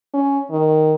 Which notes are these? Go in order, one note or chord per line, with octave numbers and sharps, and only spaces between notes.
C#4
D#3